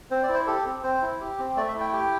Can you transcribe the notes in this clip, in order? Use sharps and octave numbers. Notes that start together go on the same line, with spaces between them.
C4 C5
D5
E4
C5
G4 A4
C4
C4 C5
E4
G4
C4
A3 D5
E5
E4
G5
G4 G5